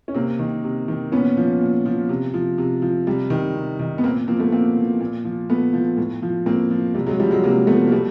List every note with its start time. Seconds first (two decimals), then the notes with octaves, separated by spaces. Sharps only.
0.08 C#4
0.14 C3 A#3 C4
0.39 D#3
0.64 C3
0.88 D#3
1.12 A#2 B3 C#4
1.37 F3
1.61 A#2
1.86 F3
2.09 C3
2.34 F3
2.58 C3
2.82 F3
3.07 C3 G3
3.30 D#3
3.55 C3
3.79 D#3
3.98 B3
4.04 A#2 A#3 C4
4.28 F3 A#3 C4
4.39 A3 B3
4.52 A#2 A#3 C4
4.76 F3
5.00 A#2
5.24 F3
5.49 A#2 A3 B3
5.73 F3
5.97 A2
6.22 F3
6.46 A2 A#3 C4
6.71 F3
6.94 C3 G3
7.06 F#3 G#3
7.20 F3 G3
7.31 F#3 G#3
7.43 C3 G#3 A#3
7.67 F3 A3 B3
7.87 A#3
7.92 B2 G3 A3